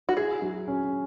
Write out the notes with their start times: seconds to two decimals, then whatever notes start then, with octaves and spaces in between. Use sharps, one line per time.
0.09 F#4
0.17 E4 G#4
0.42 F#3
0.68 C#4